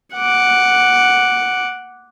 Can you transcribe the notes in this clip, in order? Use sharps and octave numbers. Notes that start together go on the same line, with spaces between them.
F#5 D6